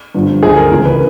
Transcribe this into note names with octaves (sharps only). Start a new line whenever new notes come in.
G2 D3 F3
D2 D3 F3 G#4
A#4
C#2 C#3 E3
B4